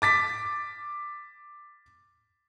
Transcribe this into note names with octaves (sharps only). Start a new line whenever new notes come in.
D6 A6 B6